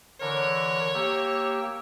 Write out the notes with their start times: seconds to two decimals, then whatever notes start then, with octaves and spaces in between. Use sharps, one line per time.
0.21 D3 E3 A#4 C#5
0.94 A#3 G4 E6